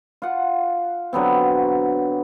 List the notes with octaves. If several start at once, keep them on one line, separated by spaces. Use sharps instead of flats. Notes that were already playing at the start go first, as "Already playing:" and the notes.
F4 F#5
D3 F#3 B3 C4